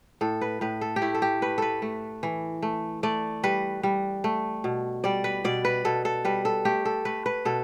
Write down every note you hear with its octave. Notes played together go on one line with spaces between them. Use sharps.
A2 A4
B4
A2 B4
A4
G4
A3 E4
A4
G4
A3 B4
A4 B4
A3
E3
A3
A3 D5
G3 B4
G3
A3
B2
G3 D5
B4
B2 D5
B4
B2 A4
A4
G3 B4
A4
A3 G4
A4
A3 B4
B4
B2 A4